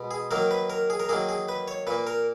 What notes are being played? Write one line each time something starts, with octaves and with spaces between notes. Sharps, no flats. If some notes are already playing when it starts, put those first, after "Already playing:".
Already playing: B2 G#3 B3
G#4
D#3 F#3 A#3 A#4
B4
A#4
G#4
A#4
D#3 F#3 A#3 G#4
G#4
B4
C#5
A#2 A#3 B4
A#4